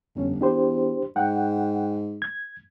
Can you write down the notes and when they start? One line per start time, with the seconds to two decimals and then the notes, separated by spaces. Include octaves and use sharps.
0.15 G1 F2 C#4
0.41 E2 D4 G4 C5
1.16 G#2 F#5 G5
2.22 G#6